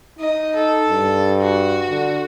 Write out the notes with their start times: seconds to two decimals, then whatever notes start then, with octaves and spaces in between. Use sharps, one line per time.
0.19 D#4 D#5
0.55 A4
0.89 G2
1.41 F#4
1.90 D3